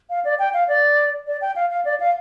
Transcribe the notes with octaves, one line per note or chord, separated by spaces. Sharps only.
F5
D5
G5
F5
D5
D5
G5
F5
F5
D5
F5